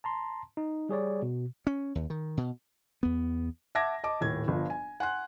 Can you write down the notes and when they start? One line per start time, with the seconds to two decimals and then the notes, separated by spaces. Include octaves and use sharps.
0.04 A5 A#5 C6
0.57 D#4
0.89 G3 G#4 C#5 D5
1.22 B2
1.67 C#4
1.95 D#2
2.10 D#3
2.37 B2
3.03 E2 B3
3.75 E5 F#5 A5 D6 G#6 A#6
4.04 D#5 A5 D6
4.21 D#1 A2 G#6
4.48 G1 F3
4.70 G#5
5.00 F#5 G#5 C6 F#6